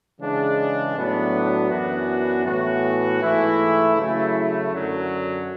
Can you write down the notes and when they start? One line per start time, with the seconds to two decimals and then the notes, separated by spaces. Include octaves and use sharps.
0.20 C#3 E3 G#3 D4
0.95 A2 F#3 B3 D4
1.70 F#2 E3 B3 D4 F#4
2.46 A2 E3 B3 F#4
3.22 G#2 E3 A3 E4
3.96 C#3 F#3 A3 E4
4.72 F#2 D3 F#3